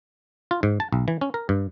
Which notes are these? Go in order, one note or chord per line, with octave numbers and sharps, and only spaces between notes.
F4
G#2
A5
B1
E3
C#4
A#4
G2